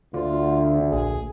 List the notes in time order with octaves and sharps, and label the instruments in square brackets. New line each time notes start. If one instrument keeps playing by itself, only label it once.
[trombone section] D2 [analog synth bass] D3 [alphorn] F4
[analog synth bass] A#1 [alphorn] G#4